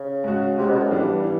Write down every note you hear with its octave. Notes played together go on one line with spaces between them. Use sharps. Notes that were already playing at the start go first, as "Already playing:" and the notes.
Already playing: C#3
G#3 C#4 F#4
C3 G#3 C#4 F#4
B2
A2
G2 E3 G3 B3 D4
E3